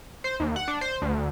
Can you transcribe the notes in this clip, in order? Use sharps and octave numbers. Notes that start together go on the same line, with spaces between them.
C5
D#2
F#5
D4
C5
D2